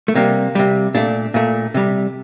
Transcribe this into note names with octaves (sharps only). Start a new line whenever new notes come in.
A3
C3 G3 A#3
C3 G3
A#2 A3 D4
A#2 A3
C3 G3